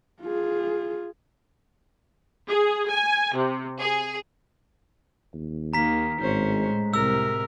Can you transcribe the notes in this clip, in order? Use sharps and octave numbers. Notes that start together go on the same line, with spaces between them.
F4 G#4
G#4
G#5
C3
G#4
D#2
D#3 A#3 A#5 B6
G#1 A2 G#3 C#4 C5 C#5
C2 C3 A#4 E6